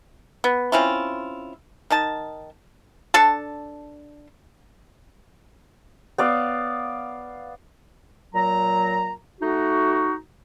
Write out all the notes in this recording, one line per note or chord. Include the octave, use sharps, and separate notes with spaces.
B3
C4 C#4 E4 F4
D#3 D#5 A5
D4 A4 A5
B3 D5 F5
A#2 F#3 A#5
A3 D#4 F#4